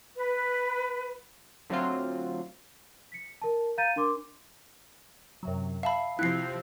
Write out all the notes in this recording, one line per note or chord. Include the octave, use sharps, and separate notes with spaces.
B4
D3 F#3 A3 C4 F4
B6 C#7
A#4 A5
F5 A#5 G6 A6 D#7
D4 A#4 C6 D6
F#2 C3 F#3
E5 F5 A5 B5 C7
C3 F3 C4 E4 F#6 C7